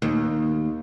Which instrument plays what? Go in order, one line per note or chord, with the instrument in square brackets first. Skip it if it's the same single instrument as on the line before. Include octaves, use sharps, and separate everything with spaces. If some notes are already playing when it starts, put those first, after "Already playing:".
[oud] D#2